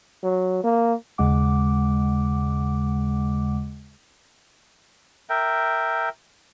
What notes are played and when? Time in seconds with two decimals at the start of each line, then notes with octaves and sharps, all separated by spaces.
0.23 F#3
0.64 A#3
1.18 D#2 C#3 G#3 F#5 D6
5.29 A#4 E5 G5